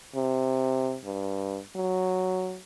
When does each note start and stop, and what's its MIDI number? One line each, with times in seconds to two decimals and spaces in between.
0.16 0.97 48
1.05 1.59 43
1.76 2.58 54